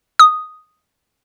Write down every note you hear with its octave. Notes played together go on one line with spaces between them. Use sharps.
D#6